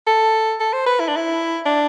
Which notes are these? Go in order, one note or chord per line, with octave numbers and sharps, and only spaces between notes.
A4
A4
C5
B4
E4
D4
E4
D4